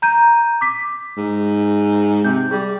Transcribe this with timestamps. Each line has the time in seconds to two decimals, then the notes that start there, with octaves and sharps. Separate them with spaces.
0.02 A#5 G6 D#7
0.61 D6 B6
1.17 G#2
2.25 C3 G6
2.51 G3 G#4